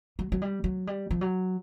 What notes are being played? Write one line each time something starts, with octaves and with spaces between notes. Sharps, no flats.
F#3
F#3
G3
F#3
G3
F3
F#3